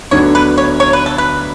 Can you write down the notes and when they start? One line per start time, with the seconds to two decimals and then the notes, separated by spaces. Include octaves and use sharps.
0.11 D2 D3 F#3 B3 D4 C#5
0.35 B4
0.58 C#5
0.80 C#5
0.93 B4
1.06 A4
1.18 B4